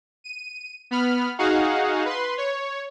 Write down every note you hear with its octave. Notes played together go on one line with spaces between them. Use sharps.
D#7
B3 B5 F6
D#4 F#4 G#4 F5 F#5
B4 C6
C#5